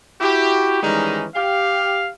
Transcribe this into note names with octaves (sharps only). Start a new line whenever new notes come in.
E4 F#4 G4
D#3 E3 G3 G#3 C#4 D#4
G4 F5